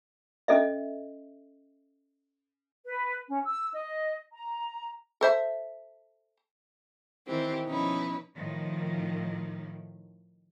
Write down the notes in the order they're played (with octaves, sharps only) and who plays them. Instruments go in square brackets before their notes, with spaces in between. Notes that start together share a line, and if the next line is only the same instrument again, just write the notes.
[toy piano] C#4 A4 D#5 E5
[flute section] B4
C#4
E6
D#5
A#5
[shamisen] A4 C5 E5
[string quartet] D#3 E3 C4 G4
B2 F3 C#4 D#4 E4 B4
[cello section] A2 D#3 F3